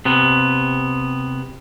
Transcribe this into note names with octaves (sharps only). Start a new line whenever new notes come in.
C3 B3